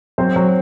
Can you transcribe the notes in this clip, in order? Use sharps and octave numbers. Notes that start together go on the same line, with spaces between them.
F#3 C4 C5
F#3